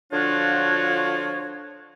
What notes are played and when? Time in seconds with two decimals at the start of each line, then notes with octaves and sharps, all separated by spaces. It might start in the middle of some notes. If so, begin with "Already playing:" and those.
0.11 D3 F3 D4 F4 F#4 C#5